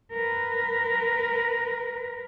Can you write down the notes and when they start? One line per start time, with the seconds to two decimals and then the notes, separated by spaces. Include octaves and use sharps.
0.12 A#4 B4